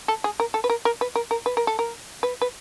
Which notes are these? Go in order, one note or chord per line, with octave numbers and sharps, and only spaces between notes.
A4
G#4
A#4
A4
B4
A#4
A#4
B4
A#4
A#4
B4
A#4
A4
A#4
B4
B4